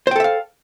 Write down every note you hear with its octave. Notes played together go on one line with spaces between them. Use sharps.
A4 C5 E5 F5 G5